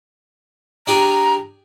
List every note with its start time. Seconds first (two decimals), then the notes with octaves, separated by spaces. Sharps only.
0.87 D4 G4 G#4 A#5